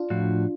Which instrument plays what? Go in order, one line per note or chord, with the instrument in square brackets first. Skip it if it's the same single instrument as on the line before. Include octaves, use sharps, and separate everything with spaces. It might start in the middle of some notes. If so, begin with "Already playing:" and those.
Already playing: [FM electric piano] D4 F4
[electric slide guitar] A2 F3 F#4